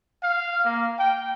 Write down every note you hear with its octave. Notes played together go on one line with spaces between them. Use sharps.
F5
A#3
G5